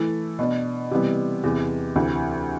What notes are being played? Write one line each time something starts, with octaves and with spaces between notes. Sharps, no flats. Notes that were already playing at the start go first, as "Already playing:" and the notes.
Already playing: E3 A3 E4 A4
B2 B3 D4
C3 E3 G3 B3
E2 C3 E3
D2 C3 E3